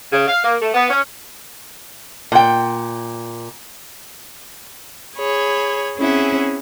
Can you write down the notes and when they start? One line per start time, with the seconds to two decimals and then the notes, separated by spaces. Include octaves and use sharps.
0.11 C#3
0.27 F5
0.43 A#3
0.61 A3
0.74 B3
0.90 C#4
2.32 A#2 G5
5.16 G#4 C#5 B5
5.97 C4 C#4 E4 G#4 E5 F#5